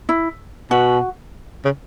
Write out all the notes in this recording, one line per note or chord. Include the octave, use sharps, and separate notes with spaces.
E4
B2 F#4
C#3